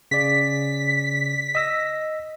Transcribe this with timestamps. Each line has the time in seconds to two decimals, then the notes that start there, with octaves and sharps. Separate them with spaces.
0.11 C#3 D5 B6
1.55 D#5 E6 A#6